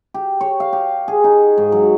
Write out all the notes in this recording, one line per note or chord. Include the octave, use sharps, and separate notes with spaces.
G4
C#5
F5
G4
G#4
D#4
G#2
F#3